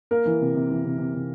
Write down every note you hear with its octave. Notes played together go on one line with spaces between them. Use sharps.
A#3 A#4
E3
C3
C3
E3
C3
C3
C3